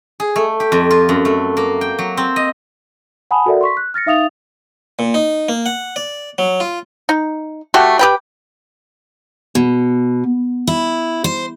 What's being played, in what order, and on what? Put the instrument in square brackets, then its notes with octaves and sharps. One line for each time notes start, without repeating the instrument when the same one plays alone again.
[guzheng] G#4
A3
G4
F2
F4
F#2
A3
A#3
G5
F#3
C4
D#5
[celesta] F#5 G#5 A5 B5 D#6
F#4 A4 A#4 D5 E5 F#5
C6 C#6 B6
F#6
F6 A6 A#6 C#7
D#4 E5 F5 D#6 A6 F7
[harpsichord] A#2
D#4
A#3
F#5
D5
F#3
F4
[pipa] D#4
A3 F#4 G4
G4 B4 G5
[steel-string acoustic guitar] B2
E4
C5